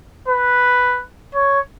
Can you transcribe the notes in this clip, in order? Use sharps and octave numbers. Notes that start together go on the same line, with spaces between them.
B4
C#5